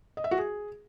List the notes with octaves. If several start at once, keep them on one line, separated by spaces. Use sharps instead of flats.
D#5
E5
F#4
G#4